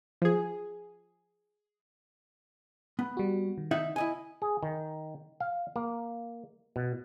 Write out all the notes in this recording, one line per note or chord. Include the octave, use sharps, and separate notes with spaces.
F3 G#4
B3
G3 F#4
D#3
D#4 E5 F#5
E4 D#5 G#5
G#4
D#3
F5
A#3
B2